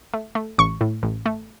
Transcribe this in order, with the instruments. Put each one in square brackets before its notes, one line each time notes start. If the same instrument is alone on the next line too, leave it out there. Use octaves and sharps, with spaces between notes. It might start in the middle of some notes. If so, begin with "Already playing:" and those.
[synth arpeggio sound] A3
A3
A1 C#6
A2
A1
A3